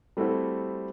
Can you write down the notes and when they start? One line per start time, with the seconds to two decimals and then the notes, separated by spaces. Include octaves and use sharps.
0.17 G3 A3 C4 E4 F#4 A4